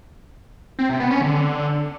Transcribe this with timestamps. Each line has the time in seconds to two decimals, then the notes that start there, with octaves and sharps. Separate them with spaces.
0.79 C4
0.89 C3
1.00 B3
1.11 C#4
1.21 D3